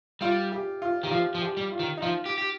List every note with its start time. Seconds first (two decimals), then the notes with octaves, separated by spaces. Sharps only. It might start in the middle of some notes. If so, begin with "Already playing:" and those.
0.21 G3 F4
0.52 G4
0.82 F4
1.03 D#3 G4
1.11 F3 F4
1.35 F3
1.42 G4
1.57 G3
1.72 F4
1.79 D#3
1.97 D#4
2.02 F3 F4
2.26 G4
2.38 G4